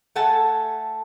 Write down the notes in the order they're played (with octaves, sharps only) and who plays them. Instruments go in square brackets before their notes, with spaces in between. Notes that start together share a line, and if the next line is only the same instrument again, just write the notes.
[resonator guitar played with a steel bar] A3 A4 F#5 G#5 A5